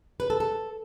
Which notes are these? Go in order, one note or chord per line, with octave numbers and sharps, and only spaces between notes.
B4
A4
A4